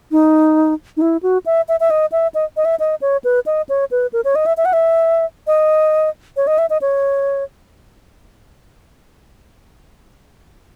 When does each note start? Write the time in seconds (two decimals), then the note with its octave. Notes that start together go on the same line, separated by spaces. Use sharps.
0.11 D#4
0.97 D#4
1.02 E4
1.23 F#4
1.46 E5
1.68 E5
1.80 E5
1.90 D#5
2.12 E5
2.34 D#5
2.57 D#5
2.65 E5
2.80 D#5
3.02 C#5
3.24 B4
3.46 D#5
3.69 C#5
3.91 B4
4.13 A#4
4.25 C#5
4.35 D#5
4.46 E5
4.57 E5
4.65 F#5
4.73 E5
5.47 D#5
6.37 C#5
6.47 D#5
6.58 E5
6.70 D#5
6.81 C#5